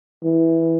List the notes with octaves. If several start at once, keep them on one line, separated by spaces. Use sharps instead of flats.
E3